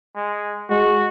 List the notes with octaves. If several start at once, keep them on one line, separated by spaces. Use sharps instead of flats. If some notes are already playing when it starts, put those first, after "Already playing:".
G#3
G#3 F#4